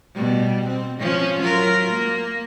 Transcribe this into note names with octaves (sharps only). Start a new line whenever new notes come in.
B2 G3
C4
F3 C#4
F#3 F4 A#4
A#3